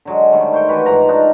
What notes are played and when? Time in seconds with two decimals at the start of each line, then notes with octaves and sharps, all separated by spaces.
0.05 D3 F#3 G#3
0.32 D#3 G3 A3
0.53 A4 C5 C#5 G5
0.69 E3 F#4 G4 B4
0.86 G#2 E3 F3 A#5
1.08 D4 D#4 F4 F#4